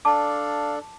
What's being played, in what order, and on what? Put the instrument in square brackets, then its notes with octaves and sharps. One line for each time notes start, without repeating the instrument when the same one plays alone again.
[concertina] D4 A4 D5 F5 [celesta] A5 D6